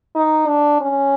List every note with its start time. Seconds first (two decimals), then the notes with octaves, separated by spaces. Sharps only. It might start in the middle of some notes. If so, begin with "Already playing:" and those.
0.15 D#4
0.48 D4
0.81 C#4